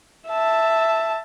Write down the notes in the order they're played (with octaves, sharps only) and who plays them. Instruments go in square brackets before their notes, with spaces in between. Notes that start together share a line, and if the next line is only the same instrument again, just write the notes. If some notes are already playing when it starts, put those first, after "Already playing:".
[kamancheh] E5 A5